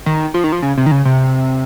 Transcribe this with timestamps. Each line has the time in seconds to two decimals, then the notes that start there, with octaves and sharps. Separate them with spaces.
0.06 D#3
0.34 F3
0.44 D#3
0.52 F3
0.62 C#3
0.78 C3
0.86 D#3
0.91 C#3
1.05 C3